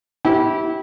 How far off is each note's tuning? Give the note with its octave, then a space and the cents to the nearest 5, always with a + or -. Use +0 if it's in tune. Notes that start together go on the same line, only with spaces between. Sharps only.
E4 -20 G4 -25